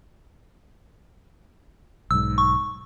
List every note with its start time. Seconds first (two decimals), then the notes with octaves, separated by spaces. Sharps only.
2.11 B1 G#2 E6
2.38 C#6